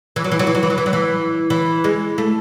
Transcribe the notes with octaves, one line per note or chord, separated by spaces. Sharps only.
E3
F#3
E3
F#3
E3
F#3
E3
F#3
E3
F#3
E3
E3
G#3
A3